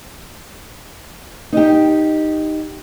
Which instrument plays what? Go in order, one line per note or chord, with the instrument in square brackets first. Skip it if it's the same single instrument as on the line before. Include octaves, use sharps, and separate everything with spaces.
[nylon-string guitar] D#4 G4